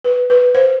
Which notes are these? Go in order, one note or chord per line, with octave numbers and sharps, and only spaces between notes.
B4
B4
C5